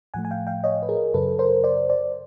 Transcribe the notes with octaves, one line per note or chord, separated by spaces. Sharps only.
A2 F3 A3 F#5 G#5
G#5
F5 G5
F5 G5
C#5 D#5
B4
G#4 A#4
F#2 C#3 F#3 A4 B4
A#4 C5
C5 D5
C5 D5